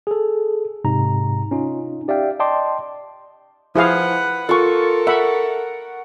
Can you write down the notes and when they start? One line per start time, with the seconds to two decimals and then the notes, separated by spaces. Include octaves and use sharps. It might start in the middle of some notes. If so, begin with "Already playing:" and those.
0.07 G#4 A4
0.84 G#2 C3 D#4 A#5
1.51 C#4 D#4 F4
2.08 G4 D5 E5 F5 G5
2.40 D5 D#5 G5 A5 C6 D6
3.76 F3 E4 G#4 B4 F5 F#5
4.49 F4 A4 A#4 C#6
5.07 E5 F#5 B5